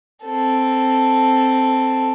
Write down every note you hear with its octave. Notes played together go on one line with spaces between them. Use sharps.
C4 A4